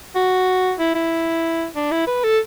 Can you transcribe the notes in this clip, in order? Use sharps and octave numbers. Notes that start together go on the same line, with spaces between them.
F#4
E4
E4
D4
E4
B4
A4